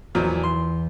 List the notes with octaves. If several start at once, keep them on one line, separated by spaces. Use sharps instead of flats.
E2 A#2 F3 F#3
C6